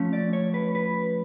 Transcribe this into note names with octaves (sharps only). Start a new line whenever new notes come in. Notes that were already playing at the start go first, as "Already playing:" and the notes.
Already playing: F3 A3 C#4
D5
C#5
B4
B4